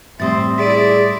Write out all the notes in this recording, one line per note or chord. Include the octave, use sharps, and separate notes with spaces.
A2 G3 C4 E5 C6 D#6 A6
E4 G#4 D5 B6 D7 D#7